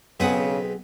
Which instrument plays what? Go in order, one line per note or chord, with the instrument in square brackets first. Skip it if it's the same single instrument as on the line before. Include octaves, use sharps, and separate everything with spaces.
[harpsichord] B1 C4 B4 [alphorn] C#3 [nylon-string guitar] B3 G#4 F#5